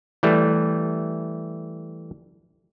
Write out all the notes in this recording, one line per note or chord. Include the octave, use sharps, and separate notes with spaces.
E3 G3 A3